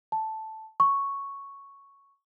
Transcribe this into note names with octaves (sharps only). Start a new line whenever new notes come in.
A5
C#6